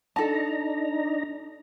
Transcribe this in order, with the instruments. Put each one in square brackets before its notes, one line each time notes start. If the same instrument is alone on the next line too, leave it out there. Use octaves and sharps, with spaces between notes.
[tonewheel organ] D4 D#4 A#5 [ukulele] A4 A5